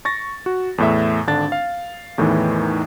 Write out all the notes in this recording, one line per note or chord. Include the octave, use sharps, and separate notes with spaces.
C#6 A6 A#6
F#4
E2 A2 E5
G#1 D3 D4 A6
F5
E2 A2 D#3 E3